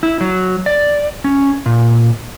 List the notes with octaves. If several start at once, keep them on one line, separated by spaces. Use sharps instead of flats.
E4
F#3
D5
C#4
A#2